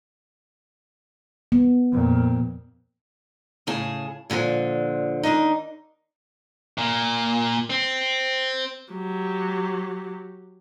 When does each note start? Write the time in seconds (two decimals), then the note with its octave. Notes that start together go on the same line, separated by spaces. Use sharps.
1.52 B3
1.92 F2 A#2
3.67 A2 C#3 G#4 A5
4.30 A#2 D3 D#3 F3
5.23 D#2 B2 D4 D#4
6.78 A#2
7.70 C4
8.92 F#3 G4